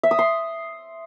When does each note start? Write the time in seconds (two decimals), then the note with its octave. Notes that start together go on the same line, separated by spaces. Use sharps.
0.03 E5
0.11 D#6
0.19 C6